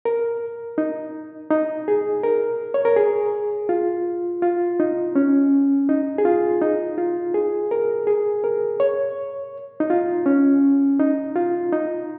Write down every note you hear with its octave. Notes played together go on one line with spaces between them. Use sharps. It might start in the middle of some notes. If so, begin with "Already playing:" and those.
A#4
D#4
D#4
G#4
A#4
C#5
A#4
G#4
F4
F4
D#4
C#4
D#4
G#4
F4
D#4
F4
G#4
A#4
G#4
A#4
C#5
D#4
F4
C#4
D#4
F4
D#4